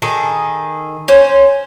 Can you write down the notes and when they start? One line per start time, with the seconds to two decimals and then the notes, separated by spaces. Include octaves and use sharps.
0.02 D#3 G#4 A4
1.08 C#4 C5